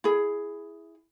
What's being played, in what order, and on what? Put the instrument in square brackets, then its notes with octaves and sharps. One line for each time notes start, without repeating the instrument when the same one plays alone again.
[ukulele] E4 G#4